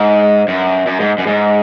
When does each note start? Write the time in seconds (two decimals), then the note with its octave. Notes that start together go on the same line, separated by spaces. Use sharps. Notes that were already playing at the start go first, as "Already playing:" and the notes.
Already playing: G#2
0.48 F#2
0.87 F#2
1.00 G#2
1.18 F#2
1.27 G#2